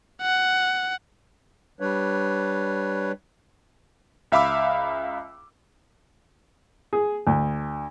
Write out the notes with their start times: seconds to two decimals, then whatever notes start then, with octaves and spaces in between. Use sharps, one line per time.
0.22 F#5
1.80 G3 D4 B4 C#5
4.32 C#2 E5 F5 B5 D6 E6
6.93 G#4
7.27 D2